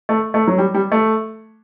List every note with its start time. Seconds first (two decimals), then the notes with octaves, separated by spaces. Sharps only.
0.09 A3
0.34 A3
0.47 F#3
0.58 G3
0.74 G3
0.92 A3